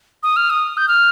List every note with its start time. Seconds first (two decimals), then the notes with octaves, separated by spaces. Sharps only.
0.23 D#6
0.36 F6
0.50 D#6
0.77 G6
0.88 F6